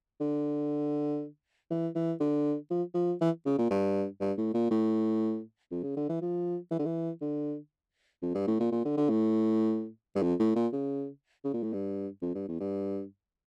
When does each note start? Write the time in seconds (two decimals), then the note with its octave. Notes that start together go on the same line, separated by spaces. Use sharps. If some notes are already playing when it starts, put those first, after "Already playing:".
0.21 D3
1.71 E3
1.95 E3
2.20 D3
2.71 F3
2.94 F3
3.21 E3
3.46 C#3
3.58 A#2
3.71 G2
4.21 G2
4.38 A2
4.54 A#2
4.71 A2
5.71 F2
5.83 C#3
5.97 D3
6.09 E3
6.22 F3
6.71 E3
6.79 D3
6.86 E3
7.21 D3
8.22 F2
8.35 G2
8.47 A2
8.60 A#2
8.72 A#2
8.85 D3
8.97 D3
9.09 A2
10.16 G2
10.23 F2
10.39 A2
10.56 A#2
10.73 C#3
11.45 C#3
11.54 A#2
11.63 A2
11.73 G2
12.22 F2
12.35 G2
12.48 E2
12.60 G2